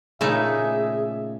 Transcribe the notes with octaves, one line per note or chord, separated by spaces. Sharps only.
A#2 C#3 A3 D#4 E4 G#4 E5